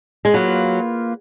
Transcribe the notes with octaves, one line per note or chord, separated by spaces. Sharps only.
G#3
F#3 A#3 F4 B4